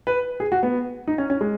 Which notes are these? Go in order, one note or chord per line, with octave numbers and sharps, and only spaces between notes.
B4
G#4
F#4
B3
D#4
C#4
C#4
G#3